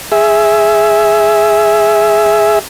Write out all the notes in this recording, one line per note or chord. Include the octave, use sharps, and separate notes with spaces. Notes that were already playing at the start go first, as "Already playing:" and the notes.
G#4 E5